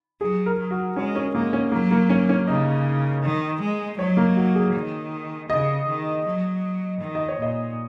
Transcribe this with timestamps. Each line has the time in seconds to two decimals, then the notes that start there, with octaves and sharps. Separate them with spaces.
0.21 F#3 G#4
0.46 A#4
0.59 F#3
0.71 F#4
0.96 G#3 C#4
1.15 C#4
1.35 G#3 A#3
1.53 C#4
1.72 F#3 A#3
1.91 A#3
2.09 C#4
2.29 C#4
2.47 C#3 D#4
3.22 D#3
3.60 G#3
3.98 F#3 C#5
4.17 A#3
4.36 F#4
4.55 G#4
4.74 D#3
5.49 C#3 D#5
5.87 D#3
6.26 F#3
7.00 D#3
7.15 D#5
7.28 C#5
7.38 A#2 D#5